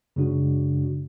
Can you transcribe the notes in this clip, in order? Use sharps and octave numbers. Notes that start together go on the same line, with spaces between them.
F#2 C#3 G#3 D4 F#4